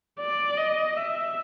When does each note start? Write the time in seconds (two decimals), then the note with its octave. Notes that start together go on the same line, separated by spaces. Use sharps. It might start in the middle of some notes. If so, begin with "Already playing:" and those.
0.20 D5
0.57 D#5
0.97 E5